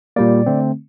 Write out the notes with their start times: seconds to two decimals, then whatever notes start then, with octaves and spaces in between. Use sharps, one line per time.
0.16 A#2 G3 A#3 D5
0.46 D3 A3 C4